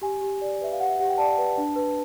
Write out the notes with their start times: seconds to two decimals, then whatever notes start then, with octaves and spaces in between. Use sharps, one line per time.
0.02 G4 G#5
0.21 G4
0.41 D5
0.61 B4 E5
0.72 F5
0.80 G4 F#5
0.89 E5
0.99 G4 F#5
1.09 G5
1.18 D5 A5
1.38 B4
1.58 D4
1.76 B4